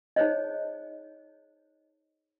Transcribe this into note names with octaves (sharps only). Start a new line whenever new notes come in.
D#4 G#4 C5 C#5 D#5